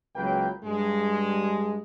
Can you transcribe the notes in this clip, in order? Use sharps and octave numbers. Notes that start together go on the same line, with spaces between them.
C#2 F#3 A#3 B4 G5
G2 G#3